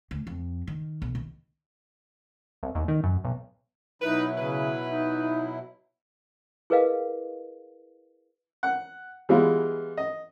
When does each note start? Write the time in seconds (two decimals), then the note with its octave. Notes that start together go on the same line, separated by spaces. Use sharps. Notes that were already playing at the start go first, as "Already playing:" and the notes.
0.11 D2
0.27 F2
0.67 D#3
1.02 B1
1.15 D#3
2.63 C2
2.75 D#2
2.88 D#3
3.04 F#2
3.24 B1
4.02 B2 F#3 D#4 E4 B4
4.38 C#3 B4
4.85 D#4
6.70 E4 G#4 A#4 B4 D#5 F5
8.63 F#5
9.29 E3 G3 G#3 B3 F4
9.97 D#5